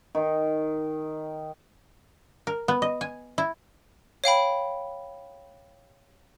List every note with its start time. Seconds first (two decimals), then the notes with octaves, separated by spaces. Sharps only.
0.15 D#3
2.47 A#4
2.68 B3
2.82 D#5
3.01 G#5
3.38 E4
4.24 C#5 F5 G5 B5